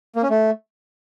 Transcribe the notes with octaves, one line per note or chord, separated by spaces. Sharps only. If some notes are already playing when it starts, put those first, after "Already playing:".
A#3
C#4
A3